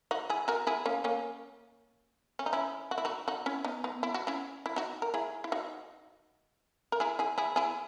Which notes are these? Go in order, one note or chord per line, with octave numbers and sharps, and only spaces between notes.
D#4 F#4
E4 G#4
F#4 A#4
E4 G#4
A#3 C#4
A#3 C#4
C#4
D#4
C#4 E4
F#4
E4
D#4 F#4
D#4 F#4
C#4 E4
B3 D#4
B3 D#4
E4
F#4
C#4 E4
E4
D#4 F#4
A#4
E4 G#4
E4
D#4 F#4
A#4
E4 G#4
E4 G#4
E4 G#4
E4 G#4